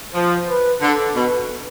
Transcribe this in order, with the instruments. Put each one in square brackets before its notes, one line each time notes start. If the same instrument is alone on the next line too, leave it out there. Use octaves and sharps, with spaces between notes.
[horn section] F3 [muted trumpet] C5
[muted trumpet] B4
[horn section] D3 [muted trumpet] A4
[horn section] B2 [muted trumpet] B4